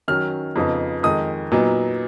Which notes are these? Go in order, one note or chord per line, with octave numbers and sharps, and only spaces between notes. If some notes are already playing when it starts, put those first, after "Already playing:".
D#3 F#3 C#4 F6
F2 C#3 F3 B3 D#4
F2 D#3 G#3 D#4 D#6
A#2 F#3 B3 D#4